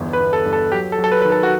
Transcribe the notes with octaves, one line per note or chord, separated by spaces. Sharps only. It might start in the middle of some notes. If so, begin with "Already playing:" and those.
Already playing: G1 E2
B4
G1
A4
G2
A4
F#3 G4
A4
F#3
A4
B4
D#3 B4
A4
F#4